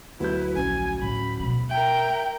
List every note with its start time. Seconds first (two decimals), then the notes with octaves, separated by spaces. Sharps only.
0.20 D2 F#3 E4 B4 G6
0.56 A#1 C#4 G#5
1.02 A2 A3 B5
1.40 B2 A3
1.69 A#4 E5 G5